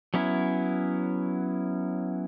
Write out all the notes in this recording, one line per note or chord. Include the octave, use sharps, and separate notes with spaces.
F#3 B3 C#4 E4